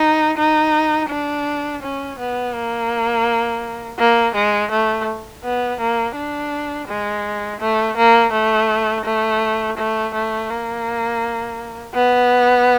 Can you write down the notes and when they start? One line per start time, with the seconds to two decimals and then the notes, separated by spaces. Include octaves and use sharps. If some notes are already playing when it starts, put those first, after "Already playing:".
Already playing: D#4
0.37 D#4
1.10 D4
1.82 C#4
2.19 B3
2.55 A#3
3.99 A#3
4.35 G#3
4.71 A3
5.44 B3
5.80 A#3
6.16 D4
6.89 G#3
7.60 A3
7.97 A#3
8.33 A3
9.05 A3
9.78 A3
10.14 A3
10.50 A#3
11.95 B3